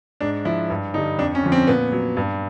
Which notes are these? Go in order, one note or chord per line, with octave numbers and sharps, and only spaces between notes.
G#2 D4
F3 E4
G2
D3 G3 D#4
F2 D4
C#4
D3 F3
C4
A#2 B3
F#3
G2